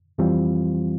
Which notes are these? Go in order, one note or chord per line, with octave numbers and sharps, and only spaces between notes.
F2 E3 G3 C4 F4